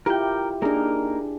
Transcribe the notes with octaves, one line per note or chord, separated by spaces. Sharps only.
E4 F4 G4 A#4 G5
A#3 D4 D#4 G#4 A#4